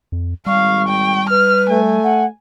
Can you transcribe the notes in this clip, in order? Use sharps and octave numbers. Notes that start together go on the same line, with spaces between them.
F2
G#1 G3 F5 C#6
G5
B4 F6
A3 G#5
F#5